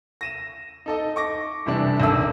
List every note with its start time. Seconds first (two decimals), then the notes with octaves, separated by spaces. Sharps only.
0.21 A#6 D#7 E7
0.86 D#4 A4 D#5
1.16 C#6 D6 A#6
1.66 F2 C3 E3 G3 D4
2.00 D#1 G#1 A4 E6